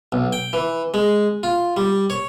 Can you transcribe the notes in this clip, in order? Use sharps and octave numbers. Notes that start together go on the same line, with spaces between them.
B1
G5
E3
G#3
F4
G3
C#5